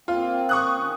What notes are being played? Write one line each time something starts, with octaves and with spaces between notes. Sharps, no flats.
A#3 C4 F4
C#6 D#6 F#6
D#3 C#4